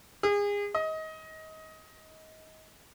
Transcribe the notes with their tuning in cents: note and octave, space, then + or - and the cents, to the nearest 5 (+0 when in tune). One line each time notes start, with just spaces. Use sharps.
G#4 -30
D#5 +25